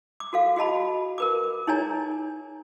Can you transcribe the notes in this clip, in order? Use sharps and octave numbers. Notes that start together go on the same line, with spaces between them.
D6
F#4 A4 F5
F#4 G#4 D#5 A5 B5
A#4 B4 D6
D#4 G#4 C#5 D5 G#5 A#5